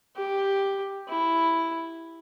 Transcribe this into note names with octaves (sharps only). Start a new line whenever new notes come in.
G4
E4